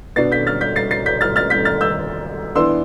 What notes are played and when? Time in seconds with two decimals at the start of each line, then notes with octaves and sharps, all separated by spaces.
0.16 B2 B3 D4 A6 C7
0.32 G6 B6
0.47 F6 A6
0.61 G6 B6
0.76 A6 C7
0.91 A6 C7
1.06 G6 B6
1.21 F6 A6
1.36 F6 A6
1.50 G6 B6
1.65 F6 A6
1.81 E6 G6
2.55 E3 B3 D4 C6 E6